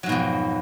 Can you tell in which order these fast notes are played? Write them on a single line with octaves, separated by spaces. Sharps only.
F#3 G#2 B2 F2